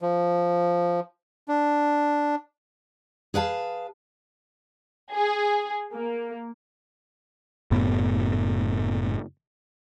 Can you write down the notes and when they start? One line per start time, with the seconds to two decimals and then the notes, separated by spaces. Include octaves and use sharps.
0.02 F3
1.48 D4
3.34 G#4 B4 F5 A5
5.13 G#4
5.93 A#3
7.71 F#1 F#2 A2 B3